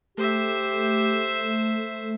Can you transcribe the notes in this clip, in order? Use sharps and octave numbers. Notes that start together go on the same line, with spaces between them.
A3 G4 C5 E5